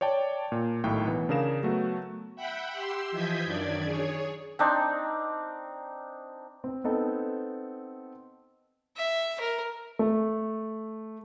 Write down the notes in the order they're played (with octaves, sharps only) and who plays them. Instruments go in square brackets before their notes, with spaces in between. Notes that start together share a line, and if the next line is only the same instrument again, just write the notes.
[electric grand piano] C#5 D5 G5 A5
A#2
B1 A2 D#3 G5
E3 B3
C#3 D4 G#4 A#4 F5 E7
F#3 A3 B3 F#4
[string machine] E5 F#5 G5 B5
G4 C6 E6
E3 F3 D#5 G6 G#6 B6
F#2 D#3 D4 D5 G#6
G#4 C#5
[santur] C4 D4 D#4
[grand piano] C4
B3 C4 D#4 A4
[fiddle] E5
A#4
[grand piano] A3